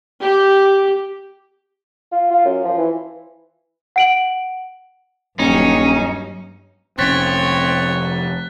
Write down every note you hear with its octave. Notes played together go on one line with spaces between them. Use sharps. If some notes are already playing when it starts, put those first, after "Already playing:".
G4
F4
F4
F#2
F3
E3
F#5 D7 F#7
D#1 G2 F#3 C#4 D#4
F1 C3 C4 C#4 C#5 F#6 A6 B6